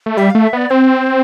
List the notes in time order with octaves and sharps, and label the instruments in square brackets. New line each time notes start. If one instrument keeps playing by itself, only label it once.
[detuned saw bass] A3
[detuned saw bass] G3 [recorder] E5
[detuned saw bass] A3 [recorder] F5
[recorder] E5
[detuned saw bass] B3 [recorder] D5
[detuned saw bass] C4 [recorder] C5